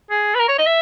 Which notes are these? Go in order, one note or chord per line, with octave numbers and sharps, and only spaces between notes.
G#4
B4
A#4
C#5
D#5
E5